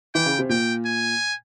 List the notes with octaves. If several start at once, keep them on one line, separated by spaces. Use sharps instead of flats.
E3 G5
C#3
C3
A#2 G5
G#5